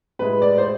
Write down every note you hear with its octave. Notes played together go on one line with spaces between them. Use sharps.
A2 G#3 B4
D5
C5